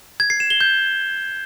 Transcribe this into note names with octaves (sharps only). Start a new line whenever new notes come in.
G#6
C7
E7
G7
G6